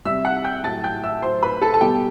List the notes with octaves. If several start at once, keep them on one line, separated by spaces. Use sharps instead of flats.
C3 G3 E5 E6
F#5 F#6
G5 G6
A2 F#3 A5 A6
G5 G6
E5 E6
A2 F#3 C5 C6
B4 B5
A4 A5
A5
B2 G3 G4 G5